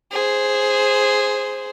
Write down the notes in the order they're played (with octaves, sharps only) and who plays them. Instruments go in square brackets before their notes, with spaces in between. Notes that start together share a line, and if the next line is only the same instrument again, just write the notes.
[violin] G#4 C5